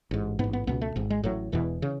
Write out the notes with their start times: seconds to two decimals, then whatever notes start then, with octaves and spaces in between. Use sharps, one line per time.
0.11 A1 G#2
0.39 A1 G#2 B3
0.53 B3
0.67 C#2 B2 B3
0.81 A3
0.96 G#1 G#2
1.10 G#3
1.24 A1 A2 F#3
1.52 E1 E2 B2 E3
1.82 C#3